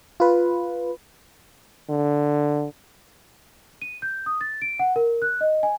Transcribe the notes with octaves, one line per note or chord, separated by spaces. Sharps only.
F4 B4
D3
D#7
G6
D#6
A6
D7
F#5
A#4
F#6
D#5
G#5